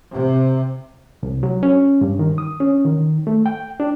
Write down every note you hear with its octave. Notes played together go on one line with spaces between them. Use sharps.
C3
C2
F#3
C#4
G2
D#3
D#6
C#4
D#3
A3
G5
D4